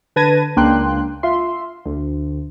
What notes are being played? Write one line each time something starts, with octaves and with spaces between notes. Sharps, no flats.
D3 B4 A5 G#6 A#6 D#7
C#2 A#3 D4 G5 C6 F#6
F4 E5 C6
D2